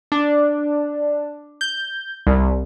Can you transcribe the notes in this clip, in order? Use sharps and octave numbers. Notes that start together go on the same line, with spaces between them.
D4
G6
C2